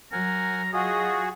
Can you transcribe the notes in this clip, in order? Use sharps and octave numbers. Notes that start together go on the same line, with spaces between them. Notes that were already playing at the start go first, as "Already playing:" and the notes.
F#3 A#4 F#5 G#5 A#5
F4 F#4 G#4 D#5